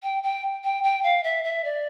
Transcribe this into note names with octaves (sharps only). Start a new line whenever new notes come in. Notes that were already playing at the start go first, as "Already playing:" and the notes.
G5
G5
G5
G5
F5
E5
E5
D5